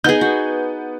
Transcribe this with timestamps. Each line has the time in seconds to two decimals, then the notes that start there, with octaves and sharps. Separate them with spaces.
0.04 B3 D#4 G#4 G6
0.21 F#4